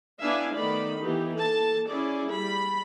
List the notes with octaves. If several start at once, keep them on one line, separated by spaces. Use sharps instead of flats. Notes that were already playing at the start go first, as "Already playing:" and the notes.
B3 D4 E4 E5 F5 G#5
D#3 A3 B3 D5 B5
E3 B3 D#4 G4
A#3 A4 A5
C#4 E4 G#4 D5
G3 B5